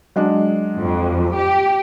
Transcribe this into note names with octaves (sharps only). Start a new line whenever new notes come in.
F#3 G#3 D4
F2
G4